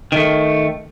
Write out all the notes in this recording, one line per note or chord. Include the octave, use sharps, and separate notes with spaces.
D#3 A3